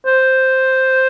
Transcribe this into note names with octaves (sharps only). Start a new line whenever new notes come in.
C5